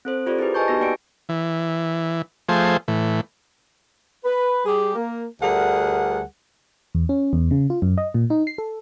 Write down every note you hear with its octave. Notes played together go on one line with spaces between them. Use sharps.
C4 A4 C5
F4 G4 A4 C5 D5
E4 G4 G#4 B4
B4 D#5 G#5 A5 C#6 G6
B3 D#4 F#4 G4 A#6
A#3 F#4 D5 G5 C#7 D7
E3
F3 A3 G#4 C5
A2 E3
B4
G3 G4 G#4
A#3
D2 G3 G#4 A#4 F#5
E2
C#4
E2
C#3
F4
F#2
D#5
A#2
D#4
C7
A4